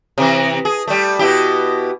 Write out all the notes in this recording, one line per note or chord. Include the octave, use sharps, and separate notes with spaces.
C3 E3
G#4
G3 A3
B2 E4 G4